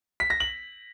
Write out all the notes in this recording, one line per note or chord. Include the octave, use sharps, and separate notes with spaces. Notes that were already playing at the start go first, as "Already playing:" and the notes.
B6
A#6
F#7